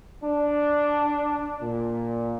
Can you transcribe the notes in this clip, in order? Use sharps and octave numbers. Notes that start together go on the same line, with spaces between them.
D4
A#2